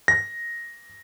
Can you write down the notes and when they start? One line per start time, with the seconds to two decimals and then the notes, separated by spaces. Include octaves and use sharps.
0.08 A#6